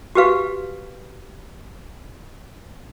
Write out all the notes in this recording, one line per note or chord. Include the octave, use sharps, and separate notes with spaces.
F#4 G4 B4 F5